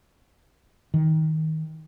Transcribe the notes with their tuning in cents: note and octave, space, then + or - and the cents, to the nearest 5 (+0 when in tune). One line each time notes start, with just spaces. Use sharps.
D#3 +20